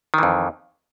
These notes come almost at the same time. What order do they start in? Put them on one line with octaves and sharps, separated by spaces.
D#3 E3 F2